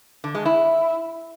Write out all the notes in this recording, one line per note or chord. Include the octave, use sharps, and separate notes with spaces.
D3
G#3
E4